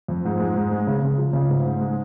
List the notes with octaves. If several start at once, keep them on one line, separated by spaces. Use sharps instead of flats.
F2
G#2
G#3
G#2
G#3
C#3
C#3
F3
C#3
G#2
G#2
G#3